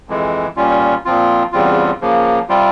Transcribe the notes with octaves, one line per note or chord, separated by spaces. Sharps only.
F2 E3 G#3
A#2 G3 C#4 F4
A#2 F3 C4 F4
E2 C#3 G3 C4 F4
C#3 F3 A#3
C3 G3 C4 F4